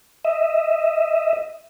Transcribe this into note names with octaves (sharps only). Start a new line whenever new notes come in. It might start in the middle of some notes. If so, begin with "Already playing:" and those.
D#5 E5